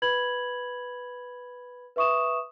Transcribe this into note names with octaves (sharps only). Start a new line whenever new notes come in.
B4 B5 G#6 F#7
B4 E5 C#6 D#6 E7